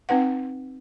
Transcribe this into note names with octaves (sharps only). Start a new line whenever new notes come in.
C4 D#4 B4 F#5